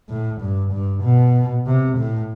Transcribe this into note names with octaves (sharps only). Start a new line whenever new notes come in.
A2
G2
G2
B2
C3
A2